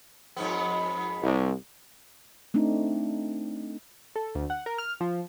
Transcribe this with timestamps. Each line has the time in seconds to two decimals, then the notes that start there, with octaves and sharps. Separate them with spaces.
0.37 F2 G#2 B3
1.22 C2
2.54 A3 C4 D4 D#4
4.16 A4
4.35 D2
4.50 F#5
4.66 A#4
4.78 F6
5.00 F3